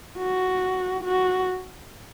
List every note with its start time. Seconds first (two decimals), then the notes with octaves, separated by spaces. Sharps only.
0.18 F#4
1.04 F#4